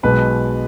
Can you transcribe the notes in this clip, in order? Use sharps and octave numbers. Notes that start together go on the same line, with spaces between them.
B1 B2 G#3 B4